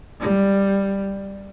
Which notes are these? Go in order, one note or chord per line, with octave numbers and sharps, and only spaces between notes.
G3